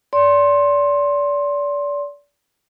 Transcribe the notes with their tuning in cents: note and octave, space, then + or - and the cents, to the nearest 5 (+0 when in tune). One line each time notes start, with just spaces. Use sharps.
D5 -30 C6 +15